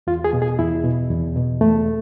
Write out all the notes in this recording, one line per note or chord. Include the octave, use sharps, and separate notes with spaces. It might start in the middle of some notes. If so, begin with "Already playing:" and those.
E2 F4
G#4
B2
G#4
E2 E4
B2
E2
B2
E2 A3